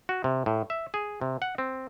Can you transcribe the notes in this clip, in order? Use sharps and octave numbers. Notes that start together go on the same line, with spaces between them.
F#4
C3
A2
E5
G#4
C3
F#5
C4